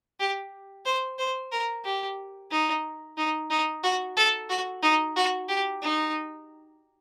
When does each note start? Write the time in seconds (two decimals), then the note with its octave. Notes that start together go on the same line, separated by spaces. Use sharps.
0.20 G4
0.86 C5
1.18 C5
1.52 A#4
1.85 G4
2.51 D#4
3.17 D#4
3.50 D#4
3.84 F#4
4.17 A4
4.49 F#4
4.83 D#4
5.16 F#4
5.49 G4
5.82 D#4